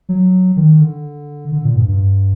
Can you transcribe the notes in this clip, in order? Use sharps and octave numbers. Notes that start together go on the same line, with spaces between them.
F#3
D#3
D3
D3
A#2
G2
G2